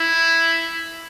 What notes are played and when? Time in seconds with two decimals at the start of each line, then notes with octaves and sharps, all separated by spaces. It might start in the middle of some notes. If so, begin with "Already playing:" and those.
Already playing: E4